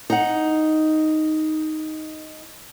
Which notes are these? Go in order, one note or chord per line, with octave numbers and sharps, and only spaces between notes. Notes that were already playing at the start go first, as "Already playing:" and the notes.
D#4 F#5